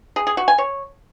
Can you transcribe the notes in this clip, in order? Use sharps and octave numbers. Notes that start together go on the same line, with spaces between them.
G#4
G#4
F#4
G#5
C#5